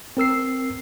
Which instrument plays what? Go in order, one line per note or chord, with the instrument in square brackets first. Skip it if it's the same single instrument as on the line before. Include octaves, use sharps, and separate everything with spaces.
[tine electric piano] C4 A#4 E6 C7